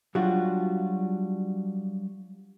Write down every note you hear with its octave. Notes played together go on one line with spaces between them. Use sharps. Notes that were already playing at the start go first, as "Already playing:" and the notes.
F#3 G3 D4 F4 F#4